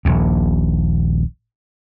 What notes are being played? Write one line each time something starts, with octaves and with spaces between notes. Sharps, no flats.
D#1 A#1 D#2